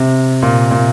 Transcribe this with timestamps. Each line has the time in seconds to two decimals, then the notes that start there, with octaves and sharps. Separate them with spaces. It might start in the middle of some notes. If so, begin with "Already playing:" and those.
Already playing: C3
0.43 A#2
0.71 A#2